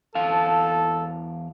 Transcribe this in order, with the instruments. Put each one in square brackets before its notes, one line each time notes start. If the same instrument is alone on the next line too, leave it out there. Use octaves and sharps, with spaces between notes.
[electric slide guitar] E2 F5 A5 [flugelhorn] A4